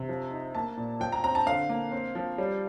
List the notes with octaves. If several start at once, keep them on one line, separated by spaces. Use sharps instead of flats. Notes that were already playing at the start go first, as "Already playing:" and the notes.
Already playing: C3
F3
D#4
A#3 A5
A#2
F3 G5
A#5
C4 A#5
A5
D3 F5
A#3
C4
F3
G3